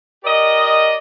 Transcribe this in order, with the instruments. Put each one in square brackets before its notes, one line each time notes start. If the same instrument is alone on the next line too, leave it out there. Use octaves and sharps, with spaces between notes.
[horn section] G4 A#4 D5 D#5